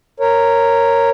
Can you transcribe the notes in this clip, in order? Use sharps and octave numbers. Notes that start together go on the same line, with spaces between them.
A#4 C#5